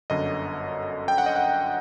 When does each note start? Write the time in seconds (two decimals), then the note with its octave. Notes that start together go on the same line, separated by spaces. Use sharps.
0.10 G1 F#2 D3 D#5
1.08 G5
1.18 F#5
1.26 D#5
1.36 F#5